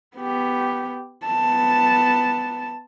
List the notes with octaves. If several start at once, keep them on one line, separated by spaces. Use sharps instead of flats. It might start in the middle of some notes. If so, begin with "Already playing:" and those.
B3 G4
B3 A5